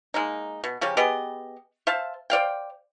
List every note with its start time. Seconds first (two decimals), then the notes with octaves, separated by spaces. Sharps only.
0.14 G#3 A#3 D#4
0.64 B2
0.81 C#3 F3 C#4 G4
0.97 B3 G4 G#4 D#5
1.87 C5 E5 F5 A5
2.30 C5 D5 F5 G5